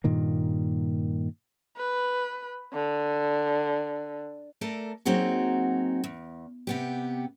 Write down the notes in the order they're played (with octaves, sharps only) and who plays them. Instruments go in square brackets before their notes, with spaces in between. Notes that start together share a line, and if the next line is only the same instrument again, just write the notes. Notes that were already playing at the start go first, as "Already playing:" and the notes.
[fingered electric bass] G2 A#2 D#3 A#3
[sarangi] B4
D3
[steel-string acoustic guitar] A3 A4 A#4 D5
F#3 A#3 C4 D#4 F#4 G#4
E2
C3 B3 G4